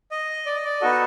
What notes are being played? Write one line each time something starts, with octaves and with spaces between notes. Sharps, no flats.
D#5
D5
D#5
D5
B3 D#4 F#4 A4 D#5